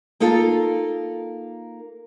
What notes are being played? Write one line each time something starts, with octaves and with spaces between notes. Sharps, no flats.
A#3 D#4 F4 A4